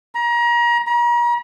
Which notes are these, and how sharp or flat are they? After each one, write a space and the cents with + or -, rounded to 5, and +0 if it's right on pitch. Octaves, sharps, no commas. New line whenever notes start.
A#5 +30
A#5 +40